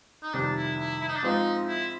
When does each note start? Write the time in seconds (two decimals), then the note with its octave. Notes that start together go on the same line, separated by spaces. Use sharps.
0.23 D#4
0.33 F2 C3 D#3 G3 D4
0.56 E4
0.78 E4
1.00 E4
1.09 D#4
1.16 D4
1.23 G#2 F3 G#3 C4 D#4 F4
1.68 E4